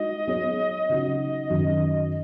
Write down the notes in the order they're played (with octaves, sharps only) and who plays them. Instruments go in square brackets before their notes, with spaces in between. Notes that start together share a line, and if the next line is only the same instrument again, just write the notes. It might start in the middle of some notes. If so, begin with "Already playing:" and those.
Already playing: [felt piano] G#3 D#4 F#4 [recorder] D#5
[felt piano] F#3 B3 G#4 C#5
[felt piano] C#3 F#3 D#4 F#4 [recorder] D#5
[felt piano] F#2 D#3 F#3